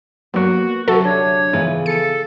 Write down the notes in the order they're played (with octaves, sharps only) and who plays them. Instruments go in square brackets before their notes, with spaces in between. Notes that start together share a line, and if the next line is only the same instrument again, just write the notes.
[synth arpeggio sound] G2 F#3 [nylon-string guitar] A#3 B3 [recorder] F#4
[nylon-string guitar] D2 C3 F#3 [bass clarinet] F#4 [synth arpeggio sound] A4
[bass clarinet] D4 [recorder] C#5
[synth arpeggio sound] G#2 [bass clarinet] C#3 [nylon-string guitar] E3 F3 B3
[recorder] A4 [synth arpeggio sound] C#7